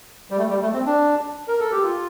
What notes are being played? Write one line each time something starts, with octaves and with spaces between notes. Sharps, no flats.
G3
A3
G3
A3
C4
D4
A#4
A4
G4
F4